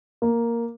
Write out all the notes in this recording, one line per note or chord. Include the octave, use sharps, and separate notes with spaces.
A#3